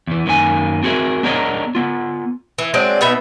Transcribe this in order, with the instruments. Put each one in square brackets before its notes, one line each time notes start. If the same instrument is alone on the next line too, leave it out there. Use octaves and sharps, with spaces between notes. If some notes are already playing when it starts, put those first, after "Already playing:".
[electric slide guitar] E2 E3
F#2 D#3 A#3 G4 G#5
C4 F#4 G#4 A#4 E5
B3 D4 G#4 A#4 C#5 D#5
B3 F4
[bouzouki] E3
F#3 G#3 C4 D4
B2 B3 D#4 E5